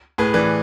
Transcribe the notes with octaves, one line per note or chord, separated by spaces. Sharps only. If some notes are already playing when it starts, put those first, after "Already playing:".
A2 G#4 B4
E3 B4 D5